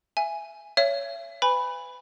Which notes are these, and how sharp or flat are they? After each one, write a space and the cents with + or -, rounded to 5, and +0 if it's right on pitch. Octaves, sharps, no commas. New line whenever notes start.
E5 +20 G#5 +0
C#5 +15 E5 +35
B4 +35 G#5 -30 B5 +0